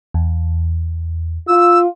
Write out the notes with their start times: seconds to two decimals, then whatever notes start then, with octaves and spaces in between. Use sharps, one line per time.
0.14 E2
1.48 F4 E6